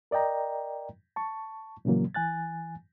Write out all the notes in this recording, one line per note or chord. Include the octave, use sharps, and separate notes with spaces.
A#4 D5 D#5 G5 A#5
A5 C#6
A#2 C#3 E3 F#3 A#3
E3 G#5 F#6 A6